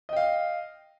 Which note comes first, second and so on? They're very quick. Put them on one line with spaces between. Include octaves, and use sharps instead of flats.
D#5 G5 F5